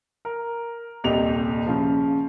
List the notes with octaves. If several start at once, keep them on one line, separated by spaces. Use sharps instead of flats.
A#4
D#1 C2 G4 D#5 F7
C#3 F3